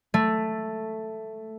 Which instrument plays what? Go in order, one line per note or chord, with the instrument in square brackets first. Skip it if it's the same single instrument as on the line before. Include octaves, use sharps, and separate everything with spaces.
[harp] A3